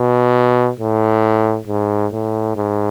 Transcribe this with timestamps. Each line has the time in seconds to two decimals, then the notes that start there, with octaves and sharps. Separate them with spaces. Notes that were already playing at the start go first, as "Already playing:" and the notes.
Already playing: B2
0.80 A2
1.67 G#2
2.12 A2
2.56 G#2